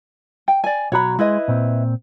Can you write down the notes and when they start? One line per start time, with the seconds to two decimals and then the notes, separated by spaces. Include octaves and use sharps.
0.48 G5
0.64 D5 G#5
0.92 B1 F#4 C#5 A#5 B5
1.19 G#3 E4 B4 D#5
1.48 A#2 C4